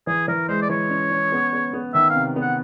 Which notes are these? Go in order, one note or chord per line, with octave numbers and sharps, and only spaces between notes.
E3 G#4
E3 A#4
G#3 C5
D5
E3 C#5
C#4
C#4
B3
B3
B3
D#3 E5
F5
C3
B3
F#5